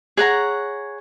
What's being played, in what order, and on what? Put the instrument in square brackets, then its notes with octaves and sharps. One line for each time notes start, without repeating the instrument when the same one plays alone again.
[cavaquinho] G#4 C#5 F#5 A#5